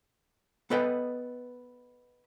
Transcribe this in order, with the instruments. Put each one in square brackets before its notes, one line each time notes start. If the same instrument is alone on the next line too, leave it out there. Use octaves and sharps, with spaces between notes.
[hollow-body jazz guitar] B3 A4 B4 D#5 G5